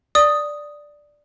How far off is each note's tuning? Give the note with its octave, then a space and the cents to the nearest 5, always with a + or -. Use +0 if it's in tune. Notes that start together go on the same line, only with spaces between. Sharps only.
D5 +0 D#6 +0